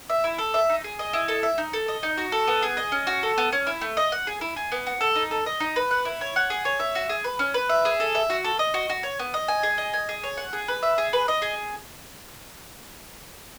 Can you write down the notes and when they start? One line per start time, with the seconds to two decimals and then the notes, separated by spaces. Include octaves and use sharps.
0.10 E5
0.24 E4
0.38 A4
0.54 E5
0.69 D#4
0.84 G#4
0.99 D#5
1.13 E4
1.28 A4
1.43 E5
1.58 D#4
1.73 A4
1.88 D#5
2.03 D#4
2.18 F#4
2.32 A4
2.47 B3
2.63 G#4
2.77 D#5
2.92 C#4
3.07 F#4
3.23 A4
3.38 B3
3.52 C#4
3.67 E4
3.81 A3
3.97 D#5
4.12 F#5
4.27 G#4
4.41 E4
4.56 G#4
4.72 B3
4.87 F#4
5.01 A4
5.16 D#4
5.31 A4
5.46 D#5
5.60 D#4
5.76 B4
5.91 F#5
6.05 E4
6.21 C#5
6.36 F#5
6.50 G#4
6.65 C#5
6.80 E5
6.95 F#4
7.09 G#4
7.24 B4
7.39 C#4
7.54 B4
7.69 E5
7.85 G#4
8.00 A4
8.15 E5
8.30 F#4
8.44 A4
8.59 D#5
8.74 F#4
8.90 F#4
9.03 C#5
9.19 B3
9.34 D#5
9.48 G#5
9.63 G#4
9.78 D#5
9.93 G#5
10.09 G#4
10.24 C#5
10.37 F#5
10.53 G#4
10.68 B4
10.83 E5
10.98 G#4
11.13 B4
11.28 D#5
11.42 G#4